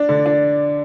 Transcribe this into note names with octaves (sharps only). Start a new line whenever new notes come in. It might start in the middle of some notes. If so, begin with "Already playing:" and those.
Already playing: D4 D5
D3
D4